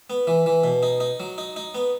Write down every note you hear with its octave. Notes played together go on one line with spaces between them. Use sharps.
B3
E3
E3
B2
D#4
D#4
F#3
D#4
D#4
B3